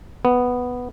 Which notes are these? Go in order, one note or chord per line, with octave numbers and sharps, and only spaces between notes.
B3